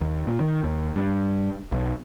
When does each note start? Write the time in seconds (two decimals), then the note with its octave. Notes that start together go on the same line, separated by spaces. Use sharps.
0.01 D#2
0.27 A#2
0.40 D#3
0.64 D#2
0.96 G2
1.72 B1